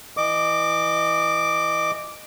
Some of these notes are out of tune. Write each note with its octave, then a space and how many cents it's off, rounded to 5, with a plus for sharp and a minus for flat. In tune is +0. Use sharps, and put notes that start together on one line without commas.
E3 +0 D#5 -25 D6 +0